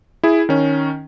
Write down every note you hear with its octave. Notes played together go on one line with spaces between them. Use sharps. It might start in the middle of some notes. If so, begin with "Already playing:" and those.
E4 G#4
D#3 C#4